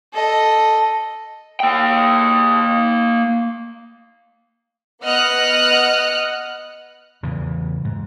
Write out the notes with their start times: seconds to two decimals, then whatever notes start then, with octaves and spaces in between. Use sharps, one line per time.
0.14 A4 D#5
1.60 A#3 G5
5.03 B3 D#5 F#5 F6 F#6
7.23 E2 C#3 E3
7.85 G#2